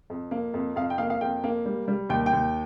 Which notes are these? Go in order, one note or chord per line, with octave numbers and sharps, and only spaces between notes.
F2
A#3
F2
F2 F5
G5
A#3 F5
F5
F2 G5
A#3
G3
G3
D#2 G5
G5
D#2